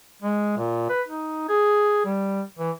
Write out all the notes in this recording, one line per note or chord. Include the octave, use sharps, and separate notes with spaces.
G#3
A#2
B4
D#4
G#4
G3
E3